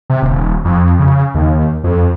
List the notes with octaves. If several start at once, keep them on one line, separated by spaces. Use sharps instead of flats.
C3
D#1
F2
C#3
D#2
F2